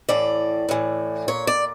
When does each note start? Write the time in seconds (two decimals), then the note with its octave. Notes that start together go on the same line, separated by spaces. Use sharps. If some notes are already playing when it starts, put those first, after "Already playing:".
0.09 A2 E3 D5
0.69 A2 E3
1.28 A#2 C#5
1.47 D5